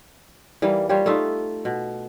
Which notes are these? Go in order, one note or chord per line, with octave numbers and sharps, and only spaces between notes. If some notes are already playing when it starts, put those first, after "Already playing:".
E3 G3 A#3
G3 F4 G4 C#5
A3 D#4 F4 E5
B2